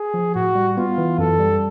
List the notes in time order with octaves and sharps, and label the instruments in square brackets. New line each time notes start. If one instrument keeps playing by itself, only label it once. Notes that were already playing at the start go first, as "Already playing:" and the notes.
Already playing: [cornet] G#4
[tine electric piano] F3
[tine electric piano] A2 [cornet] F#4
[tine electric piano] G3
[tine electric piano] B3 [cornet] F4
[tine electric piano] E3
[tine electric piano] F#2 [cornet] A4
[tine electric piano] G3